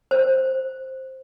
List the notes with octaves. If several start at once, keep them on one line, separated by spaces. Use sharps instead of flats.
C5